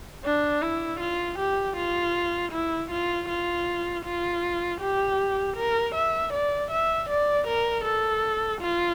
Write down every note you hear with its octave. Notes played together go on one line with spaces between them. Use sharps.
D4
E4
F4
G4
F4
E4
F4
F4
F4
G4
A#4
E5
D5
E5
D5
A#4
A4
F4